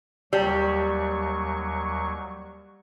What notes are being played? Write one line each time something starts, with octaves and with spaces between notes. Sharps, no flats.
D#2 F#3 G3 C#6